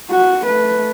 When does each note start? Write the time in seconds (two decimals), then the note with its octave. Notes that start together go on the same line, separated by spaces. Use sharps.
0.11 F#4
0.44 A3 B4